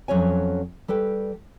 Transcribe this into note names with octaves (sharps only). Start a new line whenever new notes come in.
F2 F#3 C#4 C#5 G#5
G3 A4 B4 G5